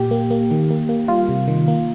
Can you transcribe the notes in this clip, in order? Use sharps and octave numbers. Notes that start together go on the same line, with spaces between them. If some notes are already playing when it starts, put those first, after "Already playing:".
Already playing: A#2 G4
A#3
A#3
D#3
A#3
A#3
G3 F4
C3
D#3
A#3